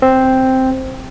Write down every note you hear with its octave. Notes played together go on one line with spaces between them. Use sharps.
C4